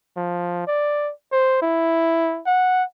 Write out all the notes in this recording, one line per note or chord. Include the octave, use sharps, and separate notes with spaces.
F3
D5
C5
E4
F#5